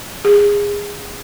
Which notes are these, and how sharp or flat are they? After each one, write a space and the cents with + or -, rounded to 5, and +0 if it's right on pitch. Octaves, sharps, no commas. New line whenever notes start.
G#4 -25